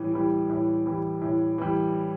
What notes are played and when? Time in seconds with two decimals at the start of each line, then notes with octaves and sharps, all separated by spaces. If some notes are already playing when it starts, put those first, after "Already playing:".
Already playing: A2 E3 G3
0.14 E3 G3
0.50 A2
0.86 E3 G3
1.22 A2
1.58 E3 G3